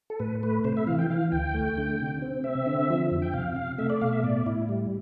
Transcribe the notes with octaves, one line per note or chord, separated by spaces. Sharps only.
A4
A2 B4
A3 B4
C3 C5
E5
E3 F5
G5
E3 F5
D2 G5
A3
D3
C3
C4
C4 E5
D3
F3
F2
G5
C3 F5
C3 F5
A3 E5
D5
B2 F5
E5
A2 D5
A2 E4
G3